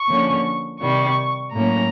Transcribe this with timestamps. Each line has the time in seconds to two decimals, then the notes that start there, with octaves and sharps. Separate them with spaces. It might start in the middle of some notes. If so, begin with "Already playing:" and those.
Already playing: C#6
0.09 D3 F3 A#3 C#4
0.80 C3 D#3 G3 C#6
1.53 A2 F#3 A#3 C#4 A#5